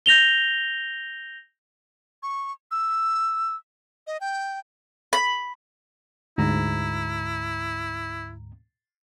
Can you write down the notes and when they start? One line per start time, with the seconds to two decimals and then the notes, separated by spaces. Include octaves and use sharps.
0.06 G6 A#6 F7 G7
2.23 C#6
2.71 E6
4.07 D#5
4.21 G5
5.13 B5
6.38 D2 G#2 E4 A#5